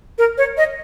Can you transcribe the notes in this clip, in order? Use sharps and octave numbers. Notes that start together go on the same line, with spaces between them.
A#4
C#5
D#5